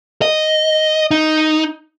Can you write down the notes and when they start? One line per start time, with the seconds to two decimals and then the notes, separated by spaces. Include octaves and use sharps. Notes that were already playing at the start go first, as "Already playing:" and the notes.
0.22 D#5
1.11 D#4